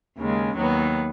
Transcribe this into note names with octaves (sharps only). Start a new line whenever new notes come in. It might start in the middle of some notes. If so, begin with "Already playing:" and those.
D#2 C#3 G#3
D#2 D#3 F#3 B3